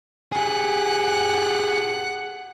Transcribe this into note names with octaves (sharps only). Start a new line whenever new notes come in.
G4 G#4 F#5 F#6